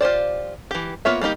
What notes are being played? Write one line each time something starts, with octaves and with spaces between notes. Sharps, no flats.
F4 G4 C5 D5
E3 G4
A#3 B3 F4 C#5 E5
G3 A#3 D#4 G4